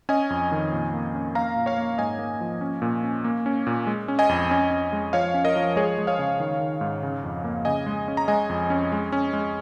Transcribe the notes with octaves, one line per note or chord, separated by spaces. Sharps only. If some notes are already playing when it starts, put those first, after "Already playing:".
C#4 D#5 G#5
F2
D#3
A#2
A#3
C#4
A#3 F5 A#5
A#2
C#5 F5
A#3
G#2 D#5 G#5
A#3
F3
C#4
A#2
C#4
A#3
C#4
A#2
G#3
C#4
D#5 G#5
F2
C#4
C#4
G#3
F3 C#5 F5
C#4
A#4 D#5
F3
G#3 G#4 C#5
G#3
C#5 F5
C#3
D#3
D#3
G#2
C#3
F2
A#3
C#3 D#5 G#5
G#3
C#4
A#5
G#3 D#5 G#5
F2
C#4
G#3
C#4
G#3